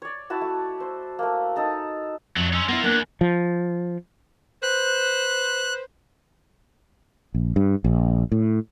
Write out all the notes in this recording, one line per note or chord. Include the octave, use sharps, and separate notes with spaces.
C#5 D5
E4 F#4 A5
A3
C5
A3 A#3
D#4 A4 A#5
F2 F#3 A3
C#4 D#4 C6 E6
A#3 B3 E4 F4
E2 A#3 B3 D4 F#6
F3
B4 C5 F#6
A#1
G2
A#1
A2